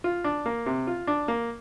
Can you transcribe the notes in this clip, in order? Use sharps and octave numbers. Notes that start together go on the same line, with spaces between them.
F4
D4
A#3
C3
F4
D4
A#3